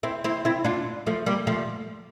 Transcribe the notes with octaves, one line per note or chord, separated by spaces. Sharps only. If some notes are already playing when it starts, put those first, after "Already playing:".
C4 E4
C4 E4
C4 E4
D4 F4
F3 A3
G3 A#3
F3 A3